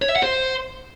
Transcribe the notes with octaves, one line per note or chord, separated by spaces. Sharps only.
C#5
E5
F#5
C5